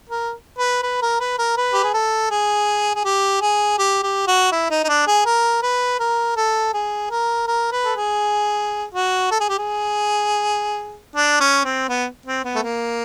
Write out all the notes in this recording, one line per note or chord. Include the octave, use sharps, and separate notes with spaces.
A#4
B4
B4
A#4
B4
A#4
B4
G4
G#4
A4
G#4
G#4
G4
G#4
G4
G4
F#4
E4
D#4
D#4
D4
G#4
A#4
B4
A#4
A4
G#4
A#4
A#4
B4
A4
G#4
F#4
A4
G#4
G4
G#4
D4
C#4
C4
B3
C4
B3
A3
A#3